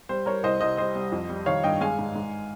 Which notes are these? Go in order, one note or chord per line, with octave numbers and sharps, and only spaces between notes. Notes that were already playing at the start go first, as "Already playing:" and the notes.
G3 C5
G3 A#4 C#5
C2 C5 D#5
C2 C5 D#5
G3 C5 D#5
G3
F2
G3
D#3 C#5 F5
G2 D#5 G5
G#3 F5 G#5
G#2
G#2